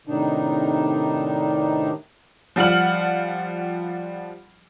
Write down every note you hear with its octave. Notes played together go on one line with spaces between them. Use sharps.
A2 C3 D#3 D4 D#4
F3 G3 F#5 F6 F#7